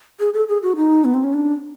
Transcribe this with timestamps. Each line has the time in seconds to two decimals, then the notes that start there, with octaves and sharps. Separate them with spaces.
0.20 G#4
0.34 A4
0.49 G#4
0.63 F#4
0.76 D#4
1.05 B3
1.14 C4
1.24 C#4
1.33 D4